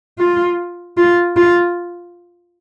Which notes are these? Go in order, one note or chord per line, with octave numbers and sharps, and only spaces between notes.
F4
F4
F4